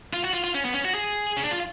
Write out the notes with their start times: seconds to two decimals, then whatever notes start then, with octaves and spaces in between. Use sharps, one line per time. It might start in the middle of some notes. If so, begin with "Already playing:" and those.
0.14 F4
0.24 F#4
0.34 F4
0.44 F4
0.55 C#4
0.64 B3
0.74 C#4
0.85 F#4
0.95 G#4
1.37 C#4
1.44 D4
1.51 F4